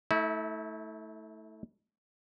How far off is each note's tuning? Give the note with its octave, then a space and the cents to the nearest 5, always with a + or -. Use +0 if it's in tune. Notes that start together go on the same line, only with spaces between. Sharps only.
A3 +0 E4 -35